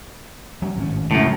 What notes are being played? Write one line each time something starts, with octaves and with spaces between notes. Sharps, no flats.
F#3 G#3 C#4
G#1 A2 C#4
F#2 A2 C#3 G#3